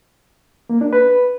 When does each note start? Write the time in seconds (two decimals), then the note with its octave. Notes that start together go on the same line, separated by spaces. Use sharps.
0.70 A#3
0.81 D4
0.93 B4